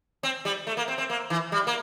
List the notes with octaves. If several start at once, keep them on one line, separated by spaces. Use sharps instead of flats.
C4
G3
A3
A#3
C4
C4
A#3
E3
G3
A#3